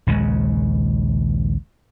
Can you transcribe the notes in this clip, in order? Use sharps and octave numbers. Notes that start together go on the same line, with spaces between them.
A#1 D#2 C#3 G#3